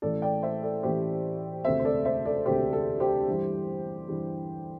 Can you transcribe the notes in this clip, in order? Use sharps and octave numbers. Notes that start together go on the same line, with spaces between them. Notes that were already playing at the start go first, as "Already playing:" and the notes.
A1 A2 E3 A3 A4 D5
D5 G5
C5 E5
A4 D5
A1 A2 E3 A3 G4 C5
E1 D2 C3 A3 C4 C5 E5
C5
A4 D5
C5 E5
A4 D5
E1 D2 C3 A3 C4 G4 C5
A4
G4 C5
G2 E3 G3
G2 E3 G3